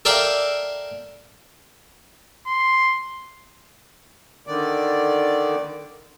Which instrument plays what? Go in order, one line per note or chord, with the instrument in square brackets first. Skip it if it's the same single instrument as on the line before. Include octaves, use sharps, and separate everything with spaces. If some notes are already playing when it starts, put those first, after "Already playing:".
[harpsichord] A4 A#4 D5 E5 F5 G5
[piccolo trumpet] C6
[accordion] D3 D#3 D5